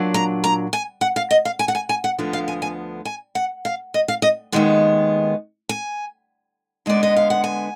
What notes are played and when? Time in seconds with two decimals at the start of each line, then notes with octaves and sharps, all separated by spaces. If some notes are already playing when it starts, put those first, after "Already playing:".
Already playing: A#2 F#3 D4
0.14 A#5
0.44 A#5
0.73 G#5
1.01 F#5
1.16 F5
1.31 D#5
1.45 F5
1.59 G#5
1.68 F#5
1.75 G#5
1.89 G#5
2.04 F#5
2.18 D2 D3 F3 B3
2.33 F5
2.48 G#5
2.62 G#5
3.05 G#5
3.35 F#5
3.65 F5
3.94 D#5
4.08 F5
4.22 D#5
4.52 D#2 D#3 G#3 B3
5.69 G#5
6.86 D3 G#3 B3 D5
7.03 D#5
7.16 F5
7.30 F#5
7.44 G#5